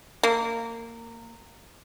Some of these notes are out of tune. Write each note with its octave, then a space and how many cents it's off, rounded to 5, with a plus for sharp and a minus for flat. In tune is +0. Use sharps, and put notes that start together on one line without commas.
A#3 -20